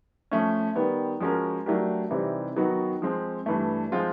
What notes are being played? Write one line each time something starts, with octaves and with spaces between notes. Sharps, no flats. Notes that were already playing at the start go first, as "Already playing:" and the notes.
F3 A3 C#4
D#3 G3 B3
F3 G#3 C#4 F#4 A#4
F#3 A3 D4 G4 A#4
C3 E3 G3 C4 D#4
D#3 F#3 B3 D#4 F#4
F3 G#3 C4
G2 E3 A3
F3 G#3 C4 F4